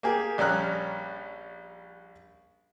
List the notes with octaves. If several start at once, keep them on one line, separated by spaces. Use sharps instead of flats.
A#3 G4 G#4
A#1 G3 C#4 A#5 F6 F#6